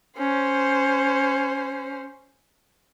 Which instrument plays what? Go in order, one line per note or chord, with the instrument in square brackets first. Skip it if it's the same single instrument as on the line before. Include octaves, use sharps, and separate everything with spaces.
[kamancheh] C#4 C5